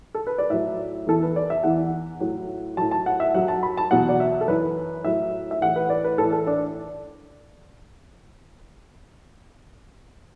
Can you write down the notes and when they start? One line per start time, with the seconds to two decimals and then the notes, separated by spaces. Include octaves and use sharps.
0.14 A4
0.27 B4
0.38 D5
0.50 A2 F#3 E5
1.06 E2 E3 A4
1.22 B4
1.36 D5
1.50 E5
1.63 E2 E3 F#5
2.20 A2 F#3
2.77 A2 F#3 A5
2.91 A5
3.06 F#5
3.20 E5
3.34 F#2 F#3 F#5
3.48 A5
3.63 B5
3.77 A5
3.91 E2 B2 F#3 F#5
4.09 D5
4.20 E5
4.41 A4
4.48 F#2 E3 B4
5.04 A2 F#3 E5
5.51 E5
5.61 A2 E3 F#5
5.76 B4
5.90 D5
6.04 B4
6.18 A2 E3 A4
6.32 A4
6.47 D4